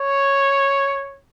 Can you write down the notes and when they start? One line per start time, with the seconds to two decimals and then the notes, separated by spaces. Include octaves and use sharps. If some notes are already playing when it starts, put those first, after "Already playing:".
Already playing: C#5